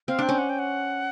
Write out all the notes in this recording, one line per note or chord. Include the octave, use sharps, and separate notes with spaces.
C4 F5
D4 G5
C#4
F#5
G5
F#5